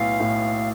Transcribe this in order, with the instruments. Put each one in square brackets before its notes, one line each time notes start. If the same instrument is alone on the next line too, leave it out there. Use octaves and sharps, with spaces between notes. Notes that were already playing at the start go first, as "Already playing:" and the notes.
Already playing: [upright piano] B1 A2 B3 [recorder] F5
[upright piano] A2